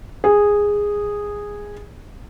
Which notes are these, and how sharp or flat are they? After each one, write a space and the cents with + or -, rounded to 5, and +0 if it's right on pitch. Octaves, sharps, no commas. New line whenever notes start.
G#4 -10